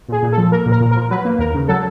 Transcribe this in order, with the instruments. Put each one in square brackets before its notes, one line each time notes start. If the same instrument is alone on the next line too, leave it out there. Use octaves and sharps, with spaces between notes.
[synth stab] A#2 G#4
A#2
A4
F3
A#3 A#4
A#2
A#4
A#2
F3 A#4
F#3 B4
A#3
D#2 A#4
C#3
F#3 A4